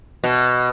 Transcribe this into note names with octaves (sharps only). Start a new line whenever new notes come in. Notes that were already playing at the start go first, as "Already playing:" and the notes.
B2